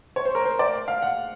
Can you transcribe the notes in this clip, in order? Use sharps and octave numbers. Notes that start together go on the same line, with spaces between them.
C#5
C5
A#4
C5
D5
F5
F#5